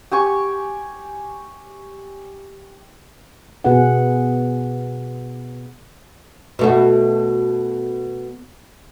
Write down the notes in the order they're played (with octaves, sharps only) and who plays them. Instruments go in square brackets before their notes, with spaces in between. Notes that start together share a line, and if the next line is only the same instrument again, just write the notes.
[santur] G4 G#5 C#6
[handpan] B2 B3 F#4 G#4 B4 F#5
[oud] B2 A3 F#4